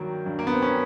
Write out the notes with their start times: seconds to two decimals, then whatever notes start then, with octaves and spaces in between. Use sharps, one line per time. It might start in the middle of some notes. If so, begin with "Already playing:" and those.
Already playing: G2 D#3 F#3 A#3
0.26 G2
0.39 A#3
0.47 B3
0.54 C4
0.62 B3 C#4